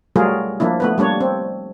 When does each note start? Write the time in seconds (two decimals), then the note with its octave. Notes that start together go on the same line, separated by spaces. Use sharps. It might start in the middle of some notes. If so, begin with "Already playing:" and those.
0.16 F#3 G3 A3 F4 G#4 A#4
0.60 F3 A#3 D4 E4
0.80 A3 B3 B4
0.98 G3 A#3 D4 C#5
1.21 C4